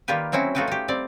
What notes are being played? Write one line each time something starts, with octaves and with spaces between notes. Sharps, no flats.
D#3 G3 A#3 F4 G4 B4
F#3 C4 C#4 E4 F#4
A3 D#4 F4 F#4 B4 G5
D#4 G4
G3 C4 D5